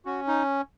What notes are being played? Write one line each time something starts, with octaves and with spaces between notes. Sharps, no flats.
C#4 F#4
D#4